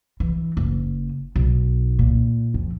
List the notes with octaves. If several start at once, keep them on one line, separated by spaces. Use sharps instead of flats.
E3
F#1
B1
A#2
F2